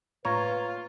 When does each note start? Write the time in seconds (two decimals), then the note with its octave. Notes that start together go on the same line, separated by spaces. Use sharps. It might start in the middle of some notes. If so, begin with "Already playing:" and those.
0.25 A2 A#3 D4 F4 B4 C#5 A#5